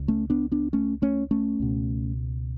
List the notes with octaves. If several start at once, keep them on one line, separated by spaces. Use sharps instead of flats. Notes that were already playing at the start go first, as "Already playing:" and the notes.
Already playing: C#2
A3 C#4
B3 D4
B3 D4
A3 C#4
A3 C#4
A3 C#4
C#2 B2